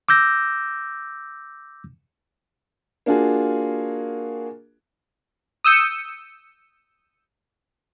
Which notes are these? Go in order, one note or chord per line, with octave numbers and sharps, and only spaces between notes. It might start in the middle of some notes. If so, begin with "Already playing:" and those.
D6 E6 G6 A#6
A#3 D4 F4 F#4 G#4
D#6 E6 G6 C#7 D#7